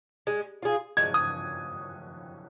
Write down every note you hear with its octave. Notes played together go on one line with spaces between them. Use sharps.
G#3
F4 G#4
G#3 G#6
D#6